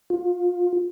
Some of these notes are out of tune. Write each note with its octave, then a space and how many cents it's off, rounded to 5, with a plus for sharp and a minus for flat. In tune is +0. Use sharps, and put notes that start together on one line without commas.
F4 +25